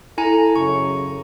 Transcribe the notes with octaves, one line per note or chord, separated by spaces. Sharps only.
E4 A4 G#5 A#5
F#2 C#3 C#6